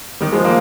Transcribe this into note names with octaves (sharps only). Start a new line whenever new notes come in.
D#3 G3
F3 G#3
G3 A#3